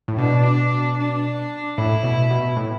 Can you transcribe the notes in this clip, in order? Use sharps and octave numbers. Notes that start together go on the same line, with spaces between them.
A2
B2 D4
D4
A2 E4
B2
B2
A2